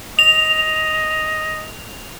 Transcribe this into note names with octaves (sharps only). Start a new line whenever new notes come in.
D#5 F7